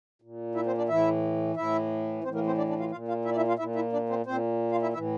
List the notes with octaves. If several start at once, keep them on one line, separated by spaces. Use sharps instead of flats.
A#2
E4 E5
C4 C5
D4 D5
A2 E3 E4 E5
A2 E3 E4 E5
A2 E3 C4 C5
A#3 A#4
C4 C5
D4 D5
D4 D5
F4 F5
A#2 F4 F5
F4 F5
E4 E5
D5
E4 E5
F4 F5
A#2 E4 E5
E4 E5
D4 D5
C4 C5
A#2 C4 C5
F4 F5
E4 E5
A2 E3 E4 E5